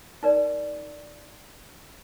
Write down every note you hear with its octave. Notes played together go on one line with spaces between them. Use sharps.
D#4 A#4 D5